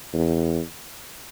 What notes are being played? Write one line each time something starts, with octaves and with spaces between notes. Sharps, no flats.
E2